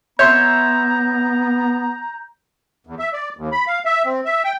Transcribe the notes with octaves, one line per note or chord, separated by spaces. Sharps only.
B3 C#5 E5 A#5 C6 G6
E2
E5
D5
D#2
B5
F5
E5
C4
E5
G5